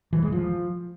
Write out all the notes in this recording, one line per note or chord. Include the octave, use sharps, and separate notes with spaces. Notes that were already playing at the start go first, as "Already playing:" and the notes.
E3
G#3
F3